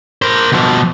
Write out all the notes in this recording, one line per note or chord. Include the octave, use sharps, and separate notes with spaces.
A#4 C5
B2 F3